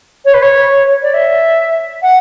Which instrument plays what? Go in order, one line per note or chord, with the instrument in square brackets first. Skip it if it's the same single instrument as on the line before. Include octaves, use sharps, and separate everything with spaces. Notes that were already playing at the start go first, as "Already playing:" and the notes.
[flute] C#5
B4
C#5
D5
E5
F#5